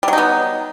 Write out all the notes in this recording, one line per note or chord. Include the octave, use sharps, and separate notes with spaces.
F#3 G3 B3 D#4